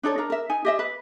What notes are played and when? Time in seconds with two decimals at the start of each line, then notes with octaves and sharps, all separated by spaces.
0.03 D4 D#4 A4 C#5
0.18 D4 A#4 A#5
0.30 A#4 E5
0.49 D#4 G#5
0.65 G4 D#5 E5
0.79 B4